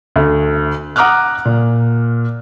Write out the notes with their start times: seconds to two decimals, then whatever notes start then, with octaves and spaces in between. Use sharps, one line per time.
0.16 D2
0.96 F#5 A#5 D6 D#6 F6 F#6
1.45 A#2